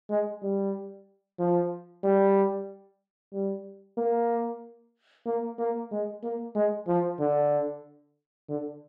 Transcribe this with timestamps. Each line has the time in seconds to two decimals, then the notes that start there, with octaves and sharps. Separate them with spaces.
0.10 G#3
0.42 G3
1.39 F3
2.04 G3
3.33 G3
3.98 A#3
5.26 A#3
5.59 A#3
5.92 G#3
6.23 A#3
6.55 G#3
6.88 F3
7.20 D3
8.49 D3